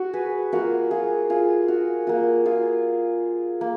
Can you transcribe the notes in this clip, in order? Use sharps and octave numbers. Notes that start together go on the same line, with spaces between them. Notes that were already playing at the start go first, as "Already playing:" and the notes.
Already playing: F#4
G#4 B4
A#3 F4 F#4 A#4
F4 G#4
F4 G#4
F#4 A#4
A#3 F4 F#4
F4 G#4
A#3